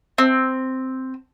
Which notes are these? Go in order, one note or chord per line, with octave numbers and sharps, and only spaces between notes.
C4